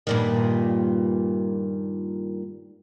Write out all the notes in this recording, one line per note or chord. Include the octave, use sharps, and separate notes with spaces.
G2 A#2 D#3